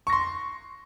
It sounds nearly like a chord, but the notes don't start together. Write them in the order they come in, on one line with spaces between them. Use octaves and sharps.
C#6 A#6 C6